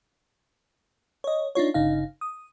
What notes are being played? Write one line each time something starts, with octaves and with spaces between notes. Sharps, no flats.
C#5 D#5
D4 D#4 F4 C#5
G1 C#3 D#4 F5
D#6